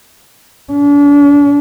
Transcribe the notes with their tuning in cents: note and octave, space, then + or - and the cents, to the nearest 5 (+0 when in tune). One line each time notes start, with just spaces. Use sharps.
D4 -40